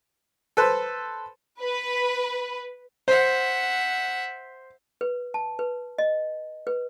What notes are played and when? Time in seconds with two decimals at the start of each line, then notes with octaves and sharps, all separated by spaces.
0.57 A4 B4 C5
1.62 B4
3.08 C5 E5 F#5
5.01 B4
5.34 A5
5.59 B4
5.98 D#5
6.67 B4